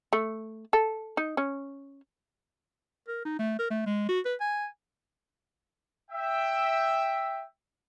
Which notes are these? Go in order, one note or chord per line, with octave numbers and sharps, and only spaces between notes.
A3
A4
D#4
C#4
A#4
D#4
A3
A#4
A3
G#3
F#4
B4
G#5
E5 G5